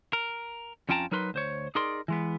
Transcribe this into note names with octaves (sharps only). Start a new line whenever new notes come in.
A#4
F2 C#4 F4 G5 A5 A#5
F#3 D#4 A#4 B4 B5 C6
D2 C5 C#5
D#4 G#4 A#4 D5 C6
E3 G#3 B3